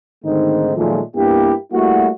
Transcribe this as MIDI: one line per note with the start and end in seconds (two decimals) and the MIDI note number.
0.25 0.72 44
0.25 0.72 50
0.25 0.72 51
0.25 0.72 57
0.25 0.72 60
0.25 0.72 63
0.76 1.00 46
0.76 1.00 51
0.76 1.00 53
0.76 1.00 54
0.76 1.00 56
0.76 1.00 57
1.16 1.54 43
1.16 1.54 58
1.16 1.54 59
1.16 1.54 64
1.16 1.54 67
1.72 2.08 55
1.72 2.08 57
1.72 2.08 58
1.72 2.08 64
1.72 2.08 66